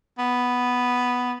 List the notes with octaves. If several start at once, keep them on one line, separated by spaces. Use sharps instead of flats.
B3